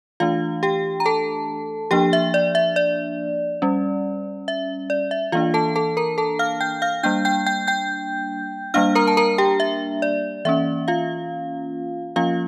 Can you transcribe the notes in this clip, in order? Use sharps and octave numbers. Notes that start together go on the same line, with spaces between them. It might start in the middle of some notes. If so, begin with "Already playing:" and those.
E3 A3 D4 F4 F5
G4 G5
A#5
A4 A5
F3 A#3 D4 G4 G5
E5
D5
E5
D5
G3 C#4
E5
D5
E5
E3 A#3 D4 F4 F5
A4 A5
A4 A5
A#4 A#5
A4 A5
F5 F6
G5 G6
F5 F6
G3 A#3 D4 G5 G6
G5 G6
G5 G6
G5 G6
G3 A#3 D4 F5 F6
A#4 A#5
A5
A#4 A#5
G4 G5
E5
D5
E3 A#3 C#4 E5
F4 F5
F3 A#3 C#4 F4 F5